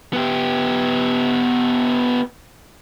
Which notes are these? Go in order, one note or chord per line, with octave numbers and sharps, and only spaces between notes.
B3 G4